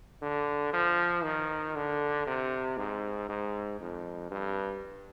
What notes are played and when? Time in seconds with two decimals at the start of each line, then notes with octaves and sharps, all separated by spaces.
0.22 D3
0.73 F3
1.24 D#3
1.76 D3
2.27 C3
2.78 G#2
3.29 G#2
3.80 F2
4.31 G2